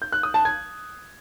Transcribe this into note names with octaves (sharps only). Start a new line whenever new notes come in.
G6
F#6
D#6
A5
G#6